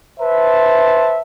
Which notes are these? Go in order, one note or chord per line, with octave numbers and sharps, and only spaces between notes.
B4 C5 E5 A5